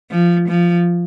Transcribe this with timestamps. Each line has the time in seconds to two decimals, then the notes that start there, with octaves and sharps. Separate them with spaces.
0.11 F3
0.48 F3